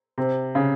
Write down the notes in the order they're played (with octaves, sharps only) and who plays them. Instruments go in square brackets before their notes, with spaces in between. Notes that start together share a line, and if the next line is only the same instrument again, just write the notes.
[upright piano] C3
C#3